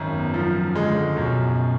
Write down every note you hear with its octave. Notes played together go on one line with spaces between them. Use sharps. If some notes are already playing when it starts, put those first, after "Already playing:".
Already playing: G#1 F#2
B3
F3 F#3
D3 G#3
F#2 B2